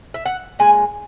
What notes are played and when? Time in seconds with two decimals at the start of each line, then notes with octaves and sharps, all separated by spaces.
0.14 E5
0.26 F#5
0.59 A#2 G#3 G#5